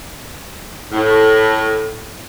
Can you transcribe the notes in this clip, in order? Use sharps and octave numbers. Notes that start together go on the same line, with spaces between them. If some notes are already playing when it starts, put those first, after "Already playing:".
A2